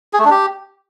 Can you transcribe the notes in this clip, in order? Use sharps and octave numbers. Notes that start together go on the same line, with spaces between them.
G#4
A3
D4
G4